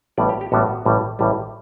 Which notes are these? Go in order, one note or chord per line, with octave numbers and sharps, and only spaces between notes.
A1 A2 G3 B3 D5
G4
G4
A1 A2 G3 B3 F#4
A1 A2 G3
A1 A2 G3